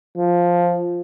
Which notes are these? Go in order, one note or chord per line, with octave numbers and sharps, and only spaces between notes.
F3